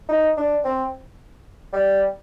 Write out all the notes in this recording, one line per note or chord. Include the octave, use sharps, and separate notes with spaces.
D#4
D4
C4
G3